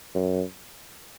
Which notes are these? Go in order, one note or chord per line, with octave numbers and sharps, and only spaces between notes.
F#2